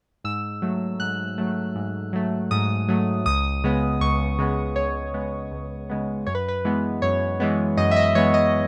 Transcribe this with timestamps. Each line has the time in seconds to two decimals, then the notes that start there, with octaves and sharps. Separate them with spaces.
0.24 G#2 E6
0.62 F#3 A3
1.00 G#2 F#6
1.38 F#3 A3
1.75 G#2
2.13 F#3 A3
2.51 G#2 D#6
2.88 F#3 A3
3.26 C#2 D#6
3.64 C#3 G#3 B3
4.01 C#2 C#6
4.38 C#3 G#3 B3
4.76 C#2 C#5
5.14 C#3 G#3 B3
5.52 C#2
5.90 C#3 G#3 B3
6.27 F#2 C#5
6.35 B4
6.48 B4
6.65 E3 G#3 B3
7.02 F#2 C#5
7.40 E3 G#3 B3
7.77 F#2 D#5
7.91 E5
7.96 D#5
8.15 E3 G#3 B3 C#5
8.34 D#5